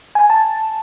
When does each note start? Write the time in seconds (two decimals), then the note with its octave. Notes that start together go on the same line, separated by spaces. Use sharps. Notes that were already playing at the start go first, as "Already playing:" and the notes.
0.15 G#5
0.30 A5